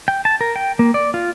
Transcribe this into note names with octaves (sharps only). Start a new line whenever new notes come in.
G5
A5
A#4
G5
A#3
D5
F4